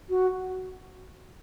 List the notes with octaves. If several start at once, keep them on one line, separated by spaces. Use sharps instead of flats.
F#4